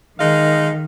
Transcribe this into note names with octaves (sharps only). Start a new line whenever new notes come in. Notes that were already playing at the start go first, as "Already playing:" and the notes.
D#3 G#3 D#4 F5